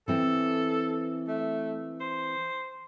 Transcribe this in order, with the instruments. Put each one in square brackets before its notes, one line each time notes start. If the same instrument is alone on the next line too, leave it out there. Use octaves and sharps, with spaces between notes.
[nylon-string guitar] E3 C4 [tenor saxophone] A4
[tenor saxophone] A3
C5